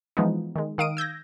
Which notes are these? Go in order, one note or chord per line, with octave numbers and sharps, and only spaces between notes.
E3 F3 G#3 B3 D#4
D#3 G#3
D#3 F5 D#6 D7 D#7
E6 G6 G#6 A#6